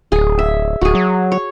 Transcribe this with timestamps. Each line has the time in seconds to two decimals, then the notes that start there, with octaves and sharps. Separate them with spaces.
0.12 D1 G#4
0.39 E5
0.81 D1 F#4 G#4
0.95 F#3
1.32 C#5